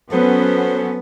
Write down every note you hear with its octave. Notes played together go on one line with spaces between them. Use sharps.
F#3 B3 C#4 F#4 A4 C5